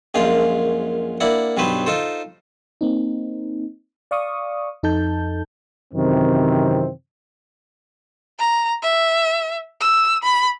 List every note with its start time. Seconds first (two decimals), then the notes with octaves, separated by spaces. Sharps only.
0.14 A#1 F#2 G#3 F4 F5
1.20 A#3 D4 E4 D5 F#5
1.57 B1 G2 F#3 B3 B4 C5
1.86 D#4 F4 A4 C5
2.81 A#3 C4 D#4
4.11 D5 F5 C#6 D#6
4.83 F2 D#4 A4 A5 G6
5.94 F#2 C3 D#3 E3 C4
8.39 A#5
8.83 E5
9.81 E6
10.23 B5